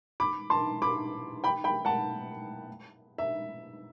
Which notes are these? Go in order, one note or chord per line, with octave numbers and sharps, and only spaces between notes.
B5 D6
A5 C6
B5 D6
G5 B5
G5 B5
F#5 A5
E5